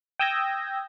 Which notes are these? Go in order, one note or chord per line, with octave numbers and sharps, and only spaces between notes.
G5 D#6 E6 G6 G#6 A#6